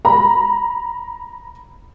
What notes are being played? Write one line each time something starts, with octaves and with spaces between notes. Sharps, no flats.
A#5 B5